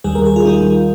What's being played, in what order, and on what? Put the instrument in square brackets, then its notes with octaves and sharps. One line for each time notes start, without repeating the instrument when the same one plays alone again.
[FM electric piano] D#2 D#3 G3 G#4
A#4
G#4
F4
D#3 G3 D#4